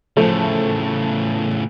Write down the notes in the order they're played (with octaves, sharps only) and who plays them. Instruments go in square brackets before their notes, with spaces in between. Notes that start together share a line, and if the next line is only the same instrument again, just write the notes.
[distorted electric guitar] A2 C#3 [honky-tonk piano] F3 A3